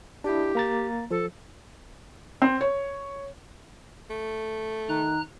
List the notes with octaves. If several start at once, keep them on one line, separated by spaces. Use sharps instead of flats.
D4 E4 G4
A#3 A#5 A6
F3 A4
C4
C#5
A3
D#3 A#5 F#6